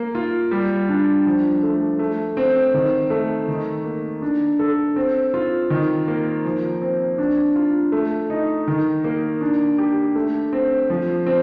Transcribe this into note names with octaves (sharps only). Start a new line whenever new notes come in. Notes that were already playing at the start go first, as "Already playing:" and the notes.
Already playing: A#3
F4
G3
D4
F3
A3
A3
C4
D#3
A3
D#3
A#3
D4
A4
C4
F4
D#3
A#3
F3
C4
D4
F4
A3
D#4
D#3
A#3
D4
G4
A3
C4
F3
C4